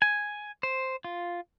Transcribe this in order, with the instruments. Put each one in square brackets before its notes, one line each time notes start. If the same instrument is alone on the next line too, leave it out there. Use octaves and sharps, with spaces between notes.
[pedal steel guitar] G#5
C5
F4